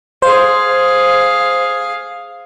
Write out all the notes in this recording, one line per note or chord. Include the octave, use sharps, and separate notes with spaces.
G#4 C5 F5